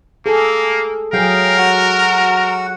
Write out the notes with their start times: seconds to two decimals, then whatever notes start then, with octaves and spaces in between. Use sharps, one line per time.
0.26 A#3 G#4 A4
1.13 F#3 G#4 A#4 F5 G5
1.57 F#4 F#5